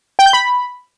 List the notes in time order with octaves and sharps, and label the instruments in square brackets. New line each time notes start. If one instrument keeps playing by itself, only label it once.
[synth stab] G5
G6
B5